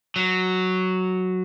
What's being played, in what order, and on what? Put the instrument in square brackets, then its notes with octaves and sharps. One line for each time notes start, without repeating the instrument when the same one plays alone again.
[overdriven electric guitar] F#3